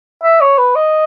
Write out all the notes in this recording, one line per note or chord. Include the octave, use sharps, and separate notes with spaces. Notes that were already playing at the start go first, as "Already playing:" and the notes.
E5
C#5
B4
D#5